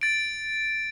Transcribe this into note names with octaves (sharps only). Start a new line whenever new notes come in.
A6 D7